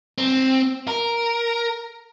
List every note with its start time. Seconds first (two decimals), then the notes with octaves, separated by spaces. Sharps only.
0.18 C4
0.88 A#4